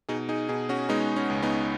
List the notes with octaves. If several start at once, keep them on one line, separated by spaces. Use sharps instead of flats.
B2 D#4 G#4
D#4 G#4
B2 D#4 G#4
C#4 F#4
G#3 B3 D#4
C#4
C#2
B3 D#4